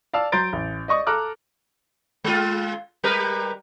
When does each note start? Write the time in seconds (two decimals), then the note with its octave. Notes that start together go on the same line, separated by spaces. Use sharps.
0.14 D5 F5 A5 E6
0.32 F#3 A#5 C6 G6 A6 D7
0.53 A1
0.88 D5 D#5 C#6 D#6
1.07 A4 A#5 D6 F6 F#6
2.24 G#3 F4
3.04 G3 A#4 B4